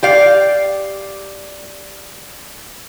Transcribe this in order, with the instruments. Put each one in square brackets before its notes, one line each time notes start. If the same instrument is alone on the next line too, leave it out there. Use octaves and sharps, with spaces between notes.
[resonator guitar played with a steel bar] G4 D5 F5